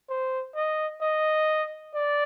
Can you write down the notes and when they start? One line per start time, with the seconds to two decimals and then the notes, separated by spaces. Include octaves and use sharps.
0.09 C5
0.55 D#5
1.01 D#5
1.95 D5